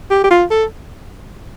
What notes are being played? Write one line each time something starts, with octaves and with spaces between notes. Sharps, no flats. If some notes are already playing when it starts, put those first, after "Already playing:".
G4
G4
F4
A4